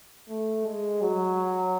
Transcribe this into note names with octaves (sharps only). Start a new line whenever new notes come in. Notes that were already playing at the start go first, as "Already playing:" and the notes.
A3
G#3
F#3